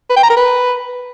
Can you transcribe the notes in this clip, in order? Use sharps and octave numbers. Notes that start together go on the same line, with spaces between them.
B4
G5
A#5
A#4
B4